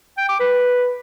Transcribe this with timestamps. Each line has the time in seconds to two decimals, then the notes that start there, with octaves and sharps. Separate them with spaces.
0.18 G5
0.29 D6
0.40 B4